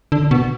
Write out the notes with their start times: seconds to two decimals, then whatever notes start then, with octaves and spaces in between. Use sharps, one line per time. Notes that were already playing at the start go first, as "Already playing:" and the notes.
0.12 D3
0.31 B2